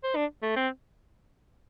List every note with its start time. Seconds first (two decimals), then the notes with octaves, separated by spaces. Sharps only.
0.03 C5
0.16 D4
0.42 A3
0.56 C4